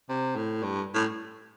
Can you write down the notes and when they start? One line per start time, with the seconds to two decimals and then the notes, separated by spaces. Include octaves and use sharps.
0.09 C3
0.36 A2
0.63 G2
0.94 A2